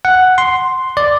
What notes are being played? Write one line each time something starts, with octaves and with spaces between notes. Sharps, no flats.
F#5
C6
D5